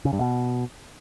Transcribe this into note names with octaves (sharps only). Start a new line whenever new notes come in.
C#3
G2
B2